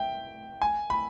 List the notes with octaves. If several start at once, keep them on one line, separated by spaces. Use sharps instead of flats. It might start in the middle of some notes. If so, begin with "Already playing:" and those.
Already playing: E5 G5
G#5
B5